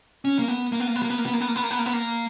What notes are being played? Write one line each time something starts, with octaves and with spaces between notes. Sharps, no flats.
C#4
A#3
B3
A#3
B3
A#3
B3
A#3
B3
A#3
B3
A#3
B3
A#3
B3
A#3
B3
A#3
B3
A#3